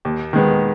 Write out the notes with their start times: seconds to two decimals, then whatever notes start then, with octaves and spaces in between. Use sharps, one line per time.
0.05 D#2
0.33 D#3 G#3 B3